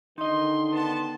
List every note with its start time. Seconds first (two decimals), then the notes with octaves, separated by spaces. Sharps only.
0.18 D3 D#3 D#4 D#5 C6
0.72 B3 A5